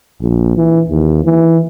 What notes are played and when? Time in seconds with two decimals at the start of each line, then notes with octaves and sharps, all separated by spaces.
0.21 A#1
0.57 E3
0.90 D#2
1.25 E3